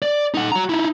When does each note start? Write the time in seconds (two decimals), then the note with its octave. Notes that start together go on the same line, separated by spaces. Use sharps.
0.02 D5
0.34 D#4 F#5
0.52 F#4 A#5
0.69 D#4 E4